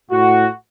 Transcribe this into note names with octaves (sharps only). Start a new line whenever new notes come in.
A2 F#4